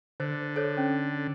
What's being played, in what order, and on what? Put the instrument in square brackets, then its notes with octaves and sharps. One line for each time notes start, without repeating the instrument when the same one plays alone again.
[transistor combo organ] D3 [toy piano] C5
[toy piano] A4 C5 C#5
C#4